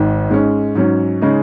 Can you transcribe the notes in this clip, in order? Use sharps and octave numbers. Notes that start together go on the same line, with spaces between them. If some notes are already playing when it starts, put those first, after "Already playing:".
Already playing: G#1 G#2 D#3
G#2 G#3 C#4
G#2 F#3 C#4
C#3 G#3 D#4